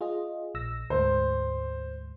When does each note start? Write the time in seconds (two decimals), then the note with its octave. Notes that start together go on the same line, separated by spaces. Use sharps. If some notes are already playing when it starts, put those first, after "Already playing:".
0.01 F4 G#4 D#5
0.55 A#1 E6 A#6
0.90 D2 G#2 C5